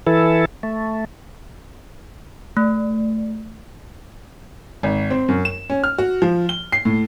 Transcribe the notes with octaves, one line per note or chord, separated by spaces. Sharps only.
E3 E4 A4
A3
A3
G#1
C4
F#2
E7
C#4
F6
F#4
F3
G7
C7
A2